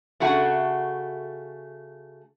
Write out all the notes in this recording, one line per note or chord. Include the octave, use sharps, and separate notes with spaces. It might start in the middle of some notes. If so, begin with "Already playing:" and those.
C#3 A3 F#4 G#4 F#5